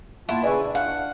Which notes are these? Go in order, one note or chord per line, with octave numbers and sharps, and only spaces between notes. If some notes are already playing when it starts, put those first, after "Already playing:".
A#2 E4 F4 F#5 A5
C#3 B4 D5 E5 G#5 C#6
D4
F5 F#5